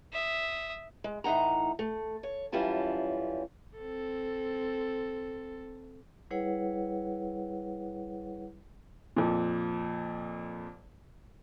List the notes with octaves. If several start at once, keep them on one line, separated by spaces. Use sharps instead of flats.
E5 D#6
G#3
A2 E3 D#4 F#5 A#5
A3
C#5
F#2 E3 G3 C#4 F4 A5
C4 A4
G3 E4 G#4 B4 C#5 F#5
F2 A#2